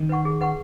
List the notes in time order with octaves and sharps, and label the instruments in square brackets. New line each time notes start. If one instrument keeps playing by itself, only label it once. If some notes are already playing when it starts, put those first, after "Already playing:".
Already playing: [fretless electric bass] D#3
[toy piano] B4 F#5 C#6
G#4
B4 F#5 C#6